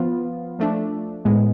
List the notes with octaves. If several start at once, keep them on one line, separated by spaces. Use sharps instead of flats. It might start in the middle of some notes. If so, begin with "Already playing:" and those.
Already playing: F3 B3 F4
F3 A3 D4
A2 G#3 B3